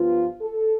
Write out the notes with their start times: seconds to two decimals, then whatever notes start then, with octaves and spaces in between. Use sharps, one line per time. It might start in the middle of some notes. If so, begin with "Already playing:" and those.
Already playing: G2 F3 B3 F4
0.41 A4